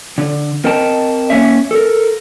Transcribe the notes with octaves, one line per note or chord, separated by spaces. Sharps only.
D3
C4 A#4 D#5 G5 A5
A#3 C#4 E5
A4 A#4